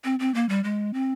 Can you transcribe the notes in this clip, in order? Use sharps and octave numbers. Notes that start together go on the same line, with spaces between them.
C4
C4
A#3
G3
G#3
C4